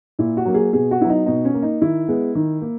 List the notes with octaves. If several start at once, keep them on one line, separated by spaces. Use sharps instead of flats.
A#2 E4
F#4
F#3 A#3
G#4
B2 G#4
F#4
F#3 B3 E4
D#4
B2 D#4
C#4
A#3
D#4
D#3 E4
G#3 B3
D#3
A#3